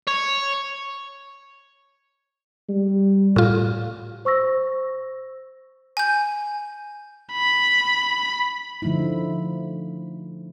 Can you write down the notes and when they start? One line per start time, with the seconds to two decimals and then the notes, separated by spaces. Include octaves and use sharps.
0.08 C#5
2.69 G3
3.36 A2 F4
4.25 C5 C#6 E6 A#6
5.97 G#5 G6
7.33 B5
8.82 D3 F3 A3 D#4 E4